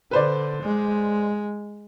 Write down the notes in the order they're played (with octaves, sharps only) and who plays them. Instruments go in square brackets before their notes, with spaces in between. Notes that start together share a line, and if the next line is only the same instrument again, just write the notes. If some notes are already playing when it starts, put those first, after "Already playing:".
[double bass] D3 [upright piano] B4 C5 D5
[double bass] G#3